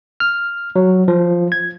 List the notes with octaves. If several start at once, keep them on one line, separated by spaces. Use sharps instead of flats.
F6
F#3
F3
G#6